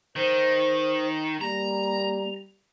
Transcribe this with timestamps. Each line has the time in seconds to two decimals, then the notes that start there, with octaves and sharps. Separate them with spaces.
0.16 D#3 C5
1.41 G3 A#3 A#5